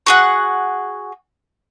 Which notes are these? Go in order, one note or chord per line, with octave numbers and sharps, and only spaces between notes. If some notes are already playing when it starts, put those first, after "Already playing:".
F#4 G#4 F#5